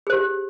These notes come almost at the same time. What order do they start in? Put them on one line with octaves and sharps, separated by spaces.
G#4 C5 G4